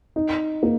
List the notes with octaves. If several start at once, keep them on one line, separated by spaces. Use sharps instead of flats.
D#4
A#3